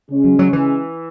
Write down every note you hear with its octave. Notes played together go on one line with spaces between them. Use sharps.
C#3 G#3 C#4
F#3
F#3
E3